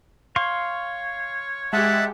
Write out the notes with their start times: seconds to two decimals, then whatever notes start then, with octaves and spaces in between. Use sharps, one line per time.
0.36 C#5 F5 C6 C#6
1.73 G#3 G4 E5 F#5 A5